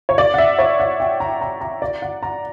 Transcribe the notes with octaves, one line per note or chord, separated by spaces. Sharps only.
C#5
D5
F#5
E5
C#5
F#5
G5
A#5
A#5
A#5
D5
F#5
A#5